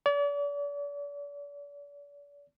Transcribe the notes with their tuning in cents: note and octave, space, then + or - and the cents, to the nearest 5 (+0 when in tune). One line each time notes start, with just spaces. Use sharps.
D5 -40